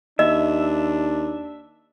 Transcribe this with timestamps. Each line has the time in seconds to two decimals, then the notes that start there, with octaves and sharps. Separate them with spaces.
0.19 D#2 D4 D#5 E5